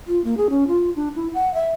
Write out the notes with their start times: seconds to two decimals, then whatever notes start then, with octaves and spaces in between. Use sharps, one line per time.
0.08 F4
0.24 A#3
0.37 G#4
0.50 C#4
0.68 F4
0.96 D4
1.16 E4
1.34 F#5
1.54 E5